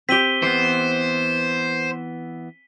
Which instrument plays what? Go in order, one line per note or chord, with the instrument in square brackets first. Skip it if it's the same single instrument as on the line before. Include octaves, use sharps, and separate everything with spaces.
[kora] C4 G4 [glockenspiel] B6 D#7 G7
[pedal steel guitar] E3 B3 [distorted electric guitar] C5